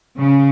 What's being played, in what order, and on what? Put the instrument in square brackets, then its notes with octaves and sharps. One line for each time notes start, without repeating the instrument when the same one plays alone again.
[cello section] C#3